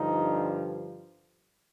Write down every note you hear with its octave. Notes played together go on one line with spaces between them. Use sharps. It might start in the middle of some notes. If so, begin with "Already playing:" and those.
Already playing: G2 D3 F3 D#4